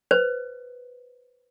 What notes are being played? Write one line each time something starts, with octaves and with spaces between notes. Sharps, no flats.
B4 C5